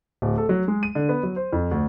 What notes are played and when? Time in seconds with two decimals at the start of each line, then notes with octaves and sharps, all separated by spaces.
0.22 D1
0.38 A4
0.49 F#3
0.68 G#3
0.83 D#7
0.95 D3
1.09 B3
1.23 F#3
1.36 C5
1.53 F2
1.71 D2